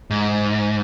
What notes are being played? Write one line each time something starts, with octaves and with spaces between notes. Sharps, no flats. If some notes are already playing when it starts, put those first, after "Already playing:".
G#2